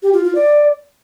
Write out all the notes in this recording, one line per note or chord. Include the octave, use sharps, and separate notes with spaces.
G4
F4
F4
D5